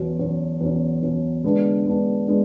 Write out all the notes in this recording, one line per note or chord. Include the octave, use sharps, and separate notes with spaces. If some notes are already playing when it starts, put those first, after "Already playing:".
Already playing: E2 B2 F#3 C#4
E2 B2 F#3 C#4
E2 B2 F#3 C#4
E2 B2 F#3 C#4
D3 G#3 B3 D4
D3 G#3 B3 D4
G#3 B3 D4